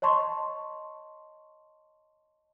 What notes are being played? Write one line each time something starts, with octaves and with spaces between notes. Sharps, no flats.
C#5 D#5 A5 C6 C#6